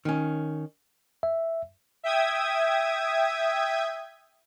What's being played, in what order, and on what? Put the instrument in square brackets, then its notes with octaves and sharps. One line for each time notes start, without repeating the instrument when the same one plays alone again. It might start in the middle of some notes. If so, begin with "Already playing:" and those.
[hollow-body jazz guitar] D#3 C#4
[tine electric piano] E5
[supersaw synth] E5 G5 D#6 G#6